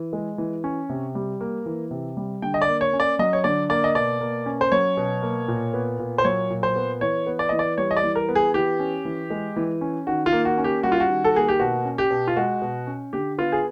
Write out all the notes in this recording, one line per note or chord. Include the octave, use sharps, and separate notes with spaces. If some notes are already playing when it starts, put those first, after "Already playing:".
Already playing: E3
G#3
E3
C#4
C3
G3
A#3
E3
C3
G3
D3 G5
D#5
D5
A#3
C#5
C#4
D5
F#3 D#5
C#5
D3 D5
A#3 D5
D#5
B2 D5
A#3
C#4
C5
F#3 C#5
B2
A#3
A#2
B3
A#2
C5
F#3 C#5
A#2
C5
B3
E3 C#5
B3
D5
E3 D#5
D5
G3 C#5
D#5
D5
E3
A#4
B3
G#4
E3 G4
C#4
E3
G#3
E3
C#4
D#3 F#4
F4
A#3
F#4
C#4
G4
G3 F#4
F4
F#4
D#3
A4
A#3 G#4
G4
B2 F#4
C#4
G4
B2
F4
G#3 F#4
B2
C#4
D3 G4
B3 F4
G#4